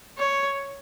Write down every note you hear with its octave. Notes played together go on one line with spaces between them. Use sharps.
C#5